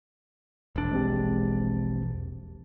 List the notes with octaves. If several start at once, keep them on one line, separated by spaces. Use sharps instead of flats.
E1 A#1 D4
G#3 C4 G4